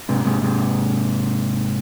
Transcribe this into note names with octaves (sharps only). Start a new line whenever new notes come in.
G#2 C3
G#2 C3
G#2 C3